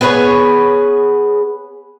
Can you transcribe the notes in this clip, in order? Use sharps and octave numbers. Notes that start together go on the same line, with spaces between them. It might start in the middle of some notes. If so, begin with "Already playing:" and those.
B3 G#4 B4 C#5